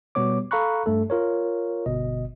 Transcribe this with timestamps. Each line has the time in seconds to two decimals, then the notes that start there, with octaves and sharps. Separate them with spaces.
0.15 B2 G3 B3 C#5 D6
0.51 A4 F5 A#5 B5 C#6 F#6
0.86 G2 A3 A4
1.10 F4 A#4 C#5
1.86 G1 B2 D#5